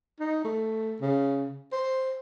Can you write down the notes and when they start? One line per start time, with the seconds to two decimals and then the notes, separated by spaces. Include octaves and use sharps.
0.20 D#4
0.44 A3
1.01 C#3
1.72 C5